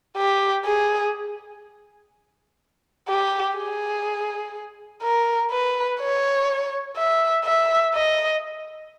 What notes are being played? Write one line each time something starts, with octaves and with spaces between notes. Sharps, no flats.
G4
G#4
G4
G#4
A#4
B4
C#5
E5
E5
D#5